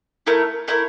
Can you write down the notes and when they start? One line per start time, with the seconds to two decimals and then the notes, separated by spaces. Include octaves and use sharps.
0.27 A3 E4 A#4
0.68 A3 E4 A#4